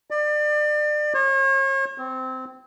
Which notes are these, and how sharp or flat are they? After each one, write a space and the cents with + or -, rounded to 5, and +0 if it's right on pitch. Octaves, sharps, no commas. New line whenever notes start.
D5 +30
C#5 -40
C4 -15